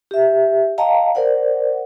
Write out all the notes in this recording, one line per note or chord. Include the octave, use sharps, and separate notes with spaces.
G4 E5
D#5 F5 G5 A5 A#5
A#4 C5 D5 F#5